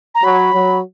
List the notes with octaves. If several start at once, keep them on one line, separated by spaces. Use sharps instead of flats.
A#5
F#3 B5
F#3